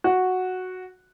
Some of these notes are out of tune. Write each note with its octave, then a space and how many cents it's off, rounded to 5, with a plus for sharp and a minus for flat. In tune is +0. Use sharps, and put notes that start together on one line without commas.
F#4 -5